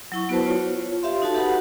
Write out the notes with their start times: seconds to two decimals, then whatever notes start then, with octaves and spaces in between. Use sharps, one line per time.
0.12 F#3 E4 C#6
0.29 B3 E4 F#4 B4 C5 A5
0.46 F4 C#5
1.03 G4 E5 F5 C6
1.22 D#4 F#4 A4 A5
1.34 G4 A4 B4 F#5 B5